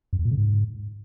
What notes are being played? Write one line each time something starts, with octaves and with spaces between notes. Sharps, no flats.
F#2
E2
A#2
C#3
G#2